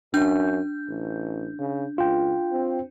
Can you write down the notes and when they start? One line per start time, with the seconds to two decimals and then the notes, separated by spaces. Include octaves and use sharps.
0.14 F#2 D4 G6
0.88 A1
1.59 C#3
1.98 C#2 F4 G5
2.52 C4